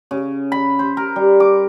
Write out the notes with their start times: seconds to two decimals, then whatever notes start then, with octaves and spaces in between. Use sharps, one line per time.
0.11 C#3
0.52 B5
0.79 C5
0.97 A#4
1.16 G3
1.40 D6